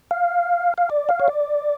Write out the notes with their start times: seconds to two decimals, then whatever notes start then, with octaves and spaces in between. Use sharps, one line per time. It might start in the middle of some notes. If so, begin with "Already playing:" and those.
0.11 F5
0.78 F5
0.90 D5
1.09 F5
1.20 C#5
1.28 D5